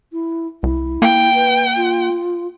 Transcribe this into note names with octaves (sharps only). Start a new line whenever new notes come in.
E4
C2 E4
A#3 G5
B4
F4